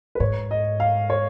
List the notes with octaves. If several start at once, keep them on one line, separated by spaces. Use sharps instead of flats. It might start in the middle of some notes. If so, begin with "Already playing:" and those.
B4
G#2 C#5
D#5
F5
C#5